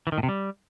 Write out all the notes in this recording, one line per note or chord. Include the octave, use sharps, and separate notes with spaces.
E3
D#3
A2
C3
G3